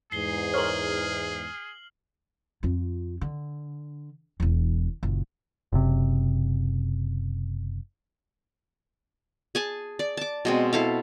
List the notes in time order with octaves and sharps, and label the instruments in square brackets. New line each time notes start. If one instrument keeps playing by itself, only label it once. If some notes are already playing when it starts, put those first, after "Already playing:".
[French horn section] E2 G#2 [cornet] G#4 [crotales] C7 G7
[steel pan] A#4 C5 C#5 [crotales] F6 F#7
[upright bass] F2 F4
D3
E1 E2
F#1 A#2
[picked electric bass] F#1 C3
[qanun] G#4 G#5 A5
D5
A5 D6
B2 G#3 C4
E4 A4 F5